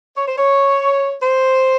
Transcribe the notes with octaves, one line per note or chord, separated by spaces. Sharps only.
C#5
C5
C#5
C5